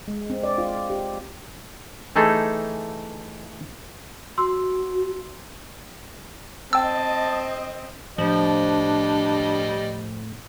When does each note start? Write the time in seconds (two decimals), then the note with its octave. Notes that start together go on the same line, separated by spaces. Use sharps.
0.08 G#3
0.30 C4
0.43 D5
0.58 F4
0.90 G4
2.16 E3 A3 D#4 G#4 A4
4.38 F#4 C6 E6
6.73 C4 D#5 G5 A5 E6
8.18 A2 F3 G3 D4 D#5